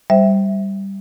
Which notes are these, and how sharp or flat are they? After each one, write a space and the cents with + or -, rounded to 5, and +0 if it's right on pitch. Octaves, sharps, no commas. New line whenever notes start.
G3 +0 C5 +0 E5 +0